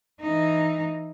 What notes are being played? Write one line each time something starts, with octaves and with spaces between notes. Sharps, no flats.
E3 D#4